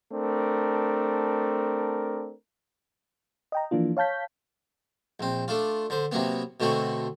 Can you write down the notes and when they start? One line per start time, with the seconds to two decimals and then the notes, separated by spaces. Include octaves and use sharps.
0.13 A3 C4 D4 A#4
3.52 D#5 G5 A#5
3.71 E3 F3 A#3 D4 F4
3.97 C#5 F5 A5 G6 B6
5.20 A#1 C4
5.48 A3 D4 F4
5.90 D3 C5
6.12 C3 F#3 A#3 B3
6.60 B2 D3 A3 C4 F#4